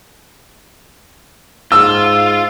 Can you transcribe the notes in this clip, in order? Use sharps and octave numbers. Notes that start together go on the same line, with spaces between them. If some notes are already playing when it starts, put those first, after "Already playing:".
G#2 F4 E6